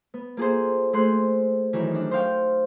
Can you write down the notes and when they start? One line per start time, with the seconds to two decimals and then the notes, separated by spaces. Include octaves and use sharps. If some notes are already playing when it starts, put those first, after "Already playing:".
0.14 B3
0.37 A#3 F4 G#4 A4 C5
0.93 A3 G#4 C5 C6 F#6
1.73 F#2 D#3 E3
1.91 D4 D#4
2.11 C5 D#5 F5 G5 C#6